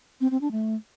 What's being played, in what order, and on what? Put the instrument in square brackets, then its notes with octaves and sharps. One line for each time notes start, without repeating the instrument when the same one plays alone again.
[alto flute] C4
C4
D4
A3